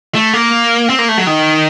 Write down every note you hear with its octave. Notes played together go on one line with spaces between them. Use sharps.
A3
A#3
C4
A#3
A3
F#3
D#3